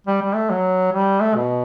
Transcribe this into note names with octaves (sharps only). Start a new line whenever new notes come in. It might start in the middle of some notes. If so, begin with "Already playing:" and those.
G3
G3
A3
F#3
G3
A3
B2